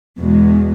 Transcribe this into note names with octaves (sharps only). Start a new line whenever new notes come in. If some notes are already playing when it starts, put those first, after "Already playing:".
E2 B2 G#3